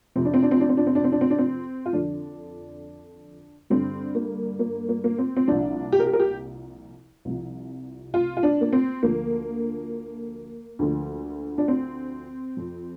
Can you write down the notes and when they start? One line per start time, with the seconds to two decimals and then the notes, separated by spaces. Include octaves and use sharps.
0.16 F2 C3 F3 C4
0.25 D4
0.34 C4
0.43 D4
0.51 C4
0.60 D4
0.69 C4
0.77 D4
0.87 C4
0.95 D4
1.04 C4
1.12 D4
1.21 C4
1.30 D4
1.38 C4
1.86 F4
1.93 F2 D3 F3 D4
3.70 G2 D3 G3 C4
4.15 A#3
4.59 A#3
4.89 A#3
5.04 A#3
5.18 C4
5.36 C4
5.48 C2 A#2 F3 D4
5.92 G4
6.00 A#4
6.06 G4
6.13 A#4
6.20 G4
7.25 C2 C3 F3
8.14 F4
8.37 F4
8.43 D4
8.61 A#3
8.73 C4
9.03 D2 D3 F3 A#3
10.79 D2 D3 F3
11.58 D4
11.68 C4
12.57 F2 F3